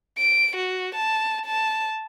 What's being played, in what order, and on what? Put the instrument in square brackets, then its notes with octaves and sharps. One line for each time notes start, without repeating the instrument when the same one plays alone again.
[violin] D7
F#4
A5
A5